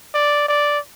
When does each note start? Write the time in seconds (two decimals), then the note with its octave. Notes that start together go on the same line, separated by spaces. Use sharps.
0.15 D5
0.48 D5